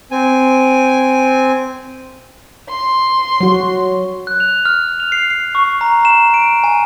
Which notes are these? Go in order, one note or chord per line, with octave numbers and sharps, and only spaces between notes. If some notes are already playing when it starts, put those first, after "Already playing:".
C4 G#5
C6
F#3 F#4
F#6
F7
F6
F7
C7
C7
C#6
A#5
E7
D7
G#5